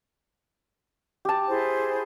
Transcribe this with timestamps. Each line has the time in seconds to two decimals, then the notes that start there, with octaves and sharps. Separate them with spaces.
1.25 G4 A5
1.47 E4 G#4 C5